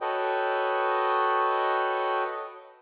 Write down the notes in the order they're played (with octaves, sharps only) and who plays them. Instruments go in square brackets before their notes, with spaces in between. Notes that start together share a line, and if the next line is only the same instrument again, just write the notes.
[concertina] F#4 A4 B4 C#5 D#5 G5